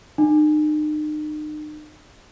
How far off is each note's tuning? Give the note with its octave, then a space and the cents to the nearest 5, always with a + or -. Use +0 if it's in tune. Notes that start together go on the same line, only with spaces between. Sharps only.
D#4 -40